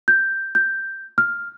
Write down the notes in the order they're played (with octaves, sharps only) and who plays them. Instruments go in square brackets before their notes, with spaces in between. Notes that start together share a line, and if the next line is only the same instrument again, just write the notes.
[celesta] G6
G6
F6